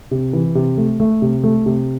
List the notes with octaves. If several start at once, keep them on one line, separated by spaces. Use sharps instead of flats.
C3
E3
C3
A3
A3
C3
A3
C3